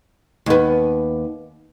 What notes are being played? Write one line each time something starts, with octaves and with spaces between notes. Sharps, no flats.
D#2 B3